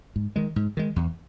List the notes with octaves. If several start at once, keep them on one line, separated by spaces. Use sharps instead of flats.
G#2
D#3 G#3
G#2
D#3 G#3
E2